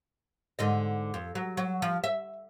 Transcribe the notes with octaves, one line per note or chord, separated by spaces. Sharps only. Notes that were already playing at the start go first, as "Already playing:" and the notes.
G#2 D3 D#5
F2
F#3
F#3
F3
E5